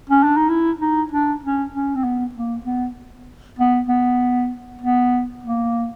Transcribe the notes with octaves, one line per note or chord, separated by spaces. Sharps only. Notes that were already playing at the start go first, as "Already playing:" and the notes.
C#4
D4
D#4
E4
D#4
D4
C#4
C#4
C4
B3
A#3
B3
B3
B3
B3
A#3